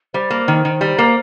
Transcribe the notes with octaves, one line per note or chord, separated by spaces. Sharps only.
G3 C5
A#3
D#3
D#3
G3
A#3